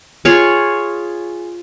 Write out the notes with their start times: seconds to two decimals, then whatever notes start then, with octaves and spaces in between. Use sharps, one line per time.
0.25 F4 G#4 C#5